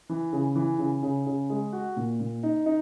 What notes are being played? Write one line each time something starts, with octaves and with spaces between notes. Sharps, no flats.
E3
C#3
E3
C#3
C#3
C#3
G#3
F#4
A#2
A#2
D#4
D#4